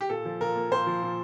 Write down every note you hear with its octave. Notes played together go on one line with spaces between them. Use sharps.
G4
A#2 A4
F3
A#2 A#4
A#3
A#2 C5
F3
A#2